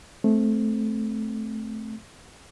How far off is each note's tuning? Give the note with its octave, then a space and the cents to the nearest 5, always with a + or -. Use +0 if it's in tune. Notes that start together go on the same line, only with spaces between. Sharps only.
A3 -15 C4 +0